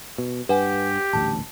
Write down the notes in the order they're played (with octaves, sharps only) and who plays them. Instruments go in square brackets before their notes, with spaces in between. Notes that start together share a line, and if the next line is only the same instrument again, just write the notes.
[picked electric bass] B2
[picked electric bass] G2 [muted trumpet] G4 [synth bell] B4 F#5 G#5
[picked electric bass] D#1 A1 D2 [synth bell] A5